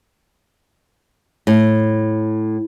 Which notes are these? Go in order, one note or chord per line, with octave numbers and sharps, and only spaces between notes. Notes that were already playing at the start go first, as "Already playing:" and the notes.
A2